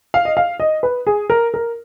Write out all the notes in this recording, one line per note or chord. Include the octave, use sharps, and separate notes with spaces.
F5
D#5
F5
D#5
B4
G#4
A#4
A#4